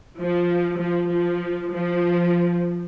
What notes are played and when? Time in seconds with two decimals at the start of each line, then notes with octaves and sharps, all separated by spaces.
0.20 F3
0.81 F3
1.12 F3
1.73 F3